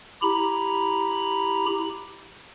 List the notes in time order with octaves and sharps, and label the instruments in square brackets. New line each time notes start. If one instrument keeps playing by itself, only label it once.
[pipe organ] E4 G4 A#5 B5